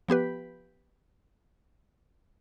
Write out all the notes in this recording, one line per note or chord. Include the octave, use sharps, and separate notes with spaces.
F3 B3 G4 B4